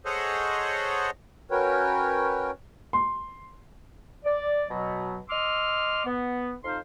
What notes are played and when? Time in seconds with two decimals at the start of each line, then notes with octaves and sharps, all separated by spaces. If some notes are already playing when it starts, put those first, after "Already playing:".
0.05 G#4 A4 C5 C#5 D#5 F#5
1.51 C#4 F#4 A#4 B4 C#5 G5
2.93 C6
4.24 D5
4.70 B2 F#3
5.29 D#5 C6 D6 E6 F6
6.05 B3
6.64 F2 D#4 C5 F5 C6